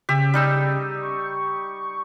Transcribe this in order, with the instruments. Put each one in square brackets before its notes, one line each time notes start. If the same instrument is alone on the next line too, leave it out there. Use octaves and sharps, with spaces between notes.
[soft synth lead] C#3 [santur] G4 E5
[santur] G3 D#4 E6
[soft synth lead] C#6